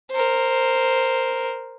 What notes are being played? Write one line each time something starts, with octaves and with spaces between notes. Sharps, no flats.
A#4 C5